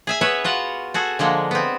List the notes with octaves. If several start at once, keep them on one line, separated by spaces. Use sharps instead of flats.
G#4 E5 G#5
B3 B4 C#5 E5
F4 F#4 F#5
F#4 G#4 A4
D3 F3 G#3 A#3
B3 C4